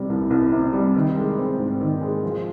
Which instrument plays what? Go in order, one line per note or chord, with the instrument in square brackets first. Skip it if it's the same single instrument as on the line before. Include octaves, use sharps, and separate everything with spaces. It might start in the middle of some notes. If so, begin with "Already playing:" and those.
Already playing: [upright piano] C3 G3
C2
C2
C3
G3
D#3
G#3
C4
G#2
D#3
G#3
F3